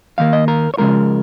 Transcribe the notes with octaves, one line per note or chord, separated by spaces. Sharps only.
D#2 D#3 A#3 F5
D#5
A#4
C#5
C#2 C#3 F3 G#3 A#4